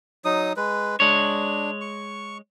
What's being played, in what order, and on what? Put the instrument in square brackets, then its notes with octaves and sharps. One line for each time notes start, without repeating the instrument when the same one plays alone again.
[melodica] F#3 D#4 D#6
G#3 B4
[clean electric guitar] G#3 C#5 [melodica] D4
[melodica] C#6